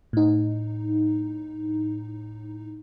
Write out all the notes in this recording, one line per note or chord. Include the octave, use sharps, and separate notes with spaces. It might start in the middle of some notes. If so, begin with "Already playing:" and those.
A2 D#4